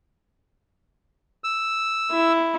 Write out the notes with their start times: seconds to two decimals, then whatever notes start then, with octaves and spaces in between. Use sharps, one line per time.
1.44 E6
2.11 E4